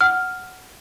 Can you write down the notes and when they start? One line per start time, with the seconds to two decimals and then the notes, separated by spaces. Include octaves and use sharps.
0.01 F#5 F6